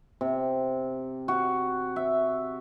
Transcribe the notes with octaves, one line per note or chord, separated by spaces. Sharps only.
C3
F#4
E5